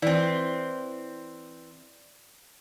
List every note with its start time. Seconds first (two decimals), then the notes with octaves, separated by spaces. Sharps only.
0.02 E3 C4 D5